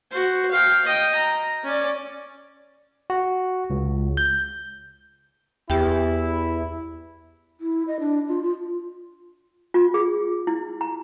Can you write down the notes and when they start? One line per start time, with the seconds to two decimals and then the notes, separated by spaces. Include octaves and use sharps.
0.12 F#4 C5
0.51 F5 G5
0.85 D#5 G5
1.15 A#5
1.64 C#4 D5
3.10 F#4
3.70 C#2
4.17 G6
5.70 E2 E4 G4 G5
7.61 E4
7.88 D#5
8.00 D4
8.28 F4
8.43 F4
9.74 F4
9.94 G#4
10.47 E4
10.81 A#5